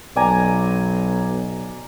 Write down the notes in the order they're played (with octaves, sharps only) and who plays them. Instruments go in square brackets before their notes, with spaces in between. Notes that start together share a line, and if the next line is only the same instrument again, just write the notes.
[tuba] B1 [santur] D5 G#5 A#5